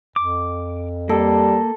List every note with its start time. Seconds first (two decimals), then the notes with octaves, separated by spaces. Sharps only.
0.16 F2 D6
1.09 G3 A#3 A4